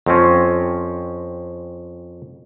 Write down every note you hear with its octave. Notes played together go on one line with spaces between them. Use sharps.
F2 C4 C#4